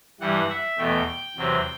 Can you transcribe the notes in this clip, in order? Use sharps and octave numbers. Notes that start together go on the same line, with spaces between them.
G2 E3 G3 F#5
E5
E2 B2 A3 G5
G5
E2 C3 F#3 C4